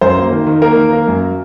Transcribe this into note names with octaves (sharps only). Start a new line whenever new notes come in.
F#2 C5
A#3
D#3
D#3
A#3 A#4
D#3
A#3
F#2